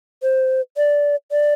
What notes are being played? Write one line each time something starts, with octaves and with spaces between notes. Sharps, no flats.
C5
D5
D5